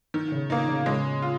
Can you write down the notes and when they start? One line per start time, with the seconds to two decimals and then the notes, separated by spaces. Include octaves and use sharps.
0.14 D#3
0.32 C#3
0.50 C#3 A#3 D#4
0.68 C#3
0.86 C#3 G#3
1.22 F4